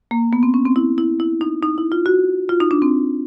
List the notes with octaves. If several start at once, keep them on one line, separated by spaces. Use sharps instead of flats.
A#3
B3
C4
C#4
C4
E4
E4
E4
D#4
D#4
E4
F4
F#4
F4
D#4
D4
C4